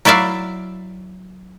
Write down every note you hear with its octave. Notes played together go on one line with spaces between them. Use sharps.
F#3 E4 D5 E5 F5